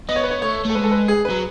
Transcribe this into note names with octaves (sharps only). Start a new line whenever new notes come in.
B3 D#5
C#5
B4
C#5
A3 C#5
A3 A4
G#3 B4
A4
B4
G#4
F#3 B4